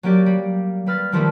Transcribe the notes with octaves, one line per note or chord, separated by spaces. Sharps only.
F#3 A#3 G4 D5
G3
G3 B4 F6 A6
D#3 F3 G3 A3 A#3